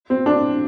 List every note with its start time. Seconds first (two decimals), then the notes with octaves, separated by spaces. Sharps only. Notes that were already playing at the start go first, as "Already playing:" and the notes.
0.10 C4
0.26 D4